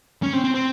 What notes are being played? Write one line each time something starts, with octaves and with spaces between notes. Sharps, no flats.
C#4
C4
C4
C4